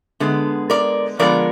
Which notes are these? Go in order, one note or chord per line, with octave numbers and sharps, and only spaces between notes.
D3 G#3 B3
A#4 D5
D3 F3 G#3 B3 A#4 D5